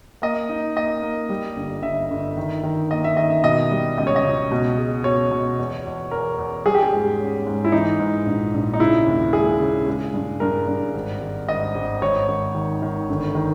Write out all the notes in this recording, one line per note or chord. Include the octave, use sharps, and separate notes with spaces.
A#3 D#5
D#4
A#3 D#5
A#3
G3
G1
G1 E5
G1
D#3
D#3
A#3 D#5
E5
D#3 D#5
E5
B2 D#5
G3
C#2 D#5
C#5
D#5
C#2
B2
G#3
B2 C#5
B2
E2
E2
E2 A#4
E2
G3 G#4
G4
G#4
G#2
C#4
G#2
E4
E3 D#4
G#2
A#1
A#1
D#4
C#3 E4
D#2
G#3 G#4
C#3
G#3
G2
G2 A#4
G2
G#1
G#1
G#1 D#5
G#1
G#1 C#5
G#1
D#3
D#3
G1
D#3